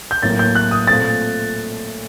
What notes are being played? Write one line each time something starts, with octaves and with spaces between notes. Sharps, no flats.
G6
A2 F#3 A#3 A6
G6
F#6
D#6
A#2 A3 C4 A6